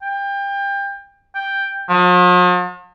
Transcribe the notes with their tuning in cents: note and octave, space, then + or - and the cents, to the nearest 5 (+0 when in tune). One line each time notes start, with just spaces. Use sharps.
G5 +25
G5 +5
F3 +45